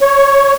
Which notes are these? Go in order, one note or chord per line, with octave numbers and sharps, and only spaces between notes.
C#5